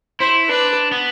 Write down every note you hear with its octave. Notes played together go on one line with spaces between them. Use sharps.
E4 C5
D4 B4
B3